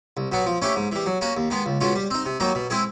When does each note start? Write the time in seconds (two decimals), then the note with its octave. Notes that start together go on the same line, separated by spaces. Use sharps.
0.17 C2
0.32 B2 F#3 B3
0.46 F3
0.62 A3 C#4 E4 G4
0.76 G#2
0.92 E3 G3
1.06 F#3
1.21 A#3 C#4 F#4
1.37 D#2
1.50 D#3 G#3 B3
1.66 C#2
1.81 B2 G#3 C#4 F4
1.95 G3
2.11 C4 D#4
2.26 C3
2.40 D#3 F#3 A#3 D#4
2.55 B2
2.70 G#3 C4 E4 G#4